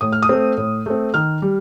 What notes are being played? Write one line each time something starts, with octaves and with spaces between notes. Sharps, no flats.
A2 D#6
F6
D#6
A3 C4
A2
A3 C4
D#3 F6
G3